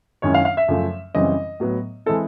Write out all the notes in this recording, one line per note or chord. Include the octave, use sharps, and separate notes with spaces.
F#2 D#3 G#3 C#4 E4 C#5
F5
F5
E5
F#2 C#3 F3 A3
F#2 C#3 E3 G3 C4 D#5
A2 F#3 B3
E3 G#3 C4 E4 A4